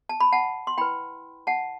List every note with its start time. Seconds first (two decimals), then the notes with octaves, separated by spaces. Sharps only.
0.09 A5
0.20 B5
0.32 F#5 A5
0.67 C6
0.78 E4 B4 G5 B5
1.47 F#5 A5